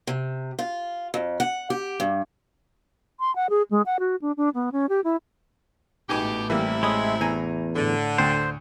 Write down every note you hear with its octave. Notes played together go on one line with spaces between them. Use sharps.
C3
F4
F2
F#5
G4
G2
C6
F#5
G#4
G#3
F#5
F#4
D4
D4
B3
C#4
G4
E4
A1 G#2 B2 A3 G4 G#5 D6
C3 E3 G3 A#3 E4
G#3 C#5 B5 D#6
E2 G#5 A#5
A2 D3
D2 C5 G5